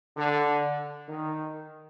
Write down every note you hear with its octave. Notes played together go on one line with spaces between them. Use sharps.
D3
D#3